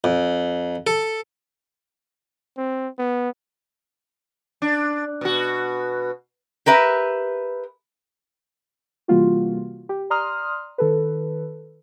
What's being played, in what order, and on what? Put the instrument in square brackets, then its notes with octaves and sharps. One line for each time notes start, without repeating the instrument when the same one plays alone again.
[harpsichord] F2
A4
[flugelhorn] C4
B3
[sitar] D4
B2 F#4
[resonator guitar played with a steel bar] G4 A#4 B4 E5
[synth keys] C3 E3 G3 A#3 F4 F#4
G4
D5 A#5 C6 D#6 F6
D#3 A4 B4